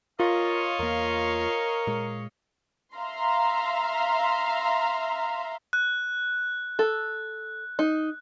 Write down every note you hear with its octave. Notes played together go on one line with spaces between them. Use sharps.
F4 A#4 C#5 D#5 F5
E2 A#3 A#4
A#2 G#3
E5 F5 A#5 C6
F#6
A4
D#4